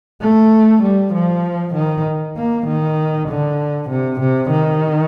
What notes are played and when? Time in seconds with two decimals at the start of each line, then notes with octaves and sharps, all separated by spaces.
0.22 A3
0.83 G3
1.13 F3
1.75 D#3
2.37 A#3
2.67 D#3
3.29 D3
3.90 C3
4.20 C3
4.51 D#3